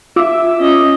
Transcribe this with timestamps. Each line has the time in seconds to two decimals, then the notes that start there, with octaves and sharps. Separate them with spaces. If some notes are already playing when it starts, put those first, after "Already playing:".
0.16 F4 E5 D6 E6
0.60 C#4 D#5